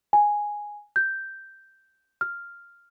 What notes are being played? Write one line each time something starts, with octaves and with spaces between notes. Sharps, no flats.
G#5
G6
F6